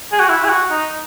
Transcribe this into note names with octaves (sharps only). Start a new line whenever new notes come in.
G#4
F#4
E4
G#4
F#4
D#4